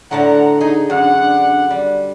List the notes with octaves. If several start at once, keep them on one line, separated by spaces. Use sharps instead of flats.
A2 D3 F#5 A5 A#5
D#4 G#4
F#2 D4 F#5
G3